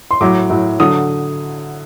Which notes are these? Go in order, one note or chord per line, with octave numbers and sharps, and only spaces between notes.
C6
A2 F#3 D6
A2 F#3
D3 F#3 D#6